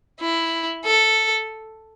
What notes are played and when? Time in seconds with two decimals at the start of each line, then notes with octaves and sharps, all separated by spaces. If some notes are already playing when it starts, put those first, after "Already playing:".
0.20 E4
0.85 A4